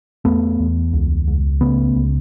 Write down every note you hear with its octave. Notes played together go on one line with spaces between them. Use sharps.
E2 A3 B3
E2
C#2
C#2
C#3 A3 B3
C#2